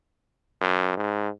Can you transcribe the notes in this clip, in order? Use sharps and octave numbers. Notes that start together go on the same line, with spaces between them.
F#2
G#2